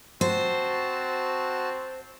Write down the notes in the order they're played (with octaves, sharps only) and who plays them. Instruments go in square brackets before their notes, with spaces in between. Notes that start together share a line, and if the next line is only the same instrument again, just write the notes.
[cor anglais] C4 [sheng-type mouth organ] F#4 A5 [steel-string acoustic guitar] C5